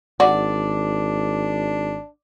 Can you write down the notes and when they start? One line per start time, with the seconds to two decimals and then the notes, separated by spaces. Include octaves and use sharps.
0.20 G#1 D4 F#4 D5